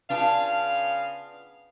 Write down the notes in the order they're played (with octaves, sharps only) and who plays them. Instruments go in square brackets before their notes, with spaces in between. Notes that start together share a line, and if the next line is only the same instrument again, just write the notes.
[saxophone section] C#3 B3 F5 [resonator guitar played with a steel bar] D4 F4